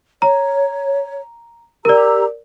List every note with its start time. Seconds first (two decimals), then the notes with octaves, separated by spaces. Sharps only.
0.22 C#5 A#5
1.85 G4 A#4 D5 A#5 E6